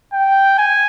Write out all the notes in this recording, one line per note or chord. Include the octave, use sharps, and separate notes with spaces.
G5
G#5